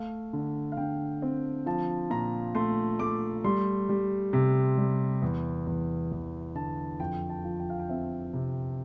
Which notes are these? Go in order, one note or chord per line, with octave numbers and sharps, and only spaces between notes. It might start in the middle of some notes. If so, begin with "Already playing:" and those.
Already playing: A3 F5
D3
F5
D3 G5
C4
F3 A5
A#2 A#5
A3 C6
A3 D6
G3 C6
G3
C3
G3
E2
E2
E2
D3 A5
F2 G5
A5
F3
G5
F5
G5
C4 E5
C3